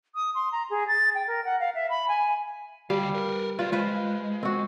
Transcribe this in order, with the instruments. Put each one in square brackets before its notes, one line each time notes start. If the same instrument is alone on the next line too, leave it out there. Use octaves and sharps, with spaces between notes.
[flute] D#6
C6
A#5
G#4
A6
G5
A#4
F#5
F5
E5
B5
G#5
[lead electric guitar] D2 F5 [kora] G3
[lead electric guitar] A#4 B4
[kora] F4 [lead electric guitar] B4 D5
[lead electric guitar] G#3 [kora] F4 B4 C5
[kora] C4 F#4